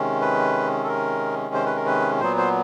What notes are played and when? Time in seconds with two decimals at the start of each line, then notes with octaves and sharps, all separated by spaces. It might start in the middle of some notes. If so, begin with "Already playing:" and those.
Already playing: C3 D#3 G#3 C#4
0.21 B4
0.84 A4
0.88 A#4
1.54 C5
1.66 B4
1.76 A#4
1.86 B4
2.21 A#2 F#3 B3 C5
2.38 C5